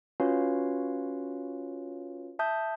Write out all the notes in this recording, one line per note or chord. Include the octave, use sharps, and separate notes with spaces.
C#4 F4 F#4 B4 C#5 F5
E5 A5 D#6 G6